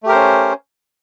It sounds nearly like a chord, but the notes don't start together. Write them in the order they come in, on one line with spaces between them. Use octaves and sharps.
A3 G4 A#4 C5 C#4